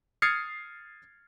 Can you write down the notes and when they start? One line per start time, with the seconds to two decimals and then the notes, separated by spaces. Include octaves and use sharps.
0.22 D#6 F6 G#6 A6 C7 C#7